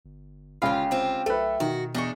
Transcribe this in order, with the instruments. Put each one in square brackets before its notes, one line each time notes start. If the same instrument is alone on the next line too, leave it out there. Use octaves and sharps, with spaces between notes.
[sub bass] G1
[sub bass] G1 [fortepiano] C#2 B5 [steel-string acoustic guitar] F4 [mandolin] G4 F5
[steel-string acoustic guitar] C4 F4
[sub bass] B1 [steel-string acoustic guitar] A3 [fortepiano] A4 B4
[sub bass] B2 [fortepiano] D#3 [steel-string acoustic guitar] F#4
[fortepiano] E2 [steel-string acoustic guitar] D4 [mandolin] D#4 D#5 C#6